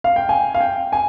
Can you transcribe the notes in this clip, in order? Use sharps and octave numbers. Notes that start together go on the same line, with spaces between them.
F5
G5
G#5
F5
G5
G#5